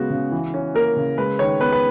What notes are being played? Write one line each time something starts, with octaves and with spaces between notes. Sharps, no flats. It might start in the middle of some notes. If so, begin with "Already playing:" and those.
Already playing: C#3 G#3 B3 F#4
C#3
E3
C#4
A#3 A#4
C#3
G#3 B4
D#3 C#5
B3 B4
B4